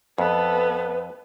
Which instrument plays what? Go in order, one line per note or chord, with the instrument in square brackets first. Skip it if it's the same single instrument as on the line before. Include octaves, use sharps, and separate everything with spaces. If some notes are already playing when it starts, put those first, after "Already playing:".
[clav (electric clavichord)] F2 [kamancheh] B3 A4 [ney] B4